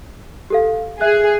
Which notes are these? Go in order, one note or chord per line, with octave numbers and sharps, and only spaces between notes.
G4 A4 F5
G#4 E5 F#6